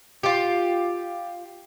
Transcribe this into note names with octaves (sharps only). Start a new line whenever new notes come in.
F4 G4